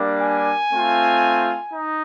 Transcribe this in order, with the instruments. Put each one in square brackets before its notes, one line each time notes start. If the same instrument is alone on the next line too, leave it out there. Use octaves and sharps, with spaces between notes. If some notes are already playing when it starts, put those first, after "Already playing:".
Already playing: [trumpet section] G3 A#3 D4
G#5
A3 C4 F4
D#4